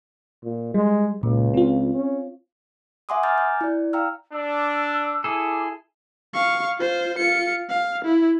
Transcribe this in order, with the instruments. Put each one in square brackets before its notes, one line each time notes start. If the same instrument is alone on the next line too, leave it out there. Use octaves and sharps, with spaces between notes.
[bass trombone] A#2
[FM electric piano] G3 [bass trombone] G#3
[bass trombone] C#2 [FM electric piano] A#2
[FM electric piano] C4 F4
[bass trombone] C#4
[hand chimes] E5 F#5 G#5 C6 D6 D#6
G#5 A#5 D6 F6 G6 A6
G6
E4 D5
F5 G5 A#5 E6 F6
[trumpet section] D4 [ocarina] E6
[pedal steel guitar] E4 G#4 A4 [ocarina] D6
[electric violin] F5 C#6
F4 C5
F4 C#7
F5
E4